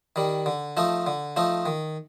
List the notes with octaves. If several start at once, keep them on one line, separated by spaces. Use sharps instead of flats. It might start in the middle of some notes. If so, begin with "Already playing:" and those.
D#3 G3
D3
F3 A3 D#4
D3
F3 A3 D#4
D#3